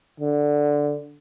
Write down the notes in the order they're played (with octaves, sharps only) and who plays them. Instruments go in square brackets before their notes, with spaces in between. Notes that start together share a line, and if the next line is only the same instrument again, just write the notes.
[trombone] D3